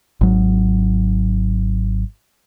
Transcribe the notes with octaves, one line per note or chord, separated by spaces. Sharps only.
G#1 F#3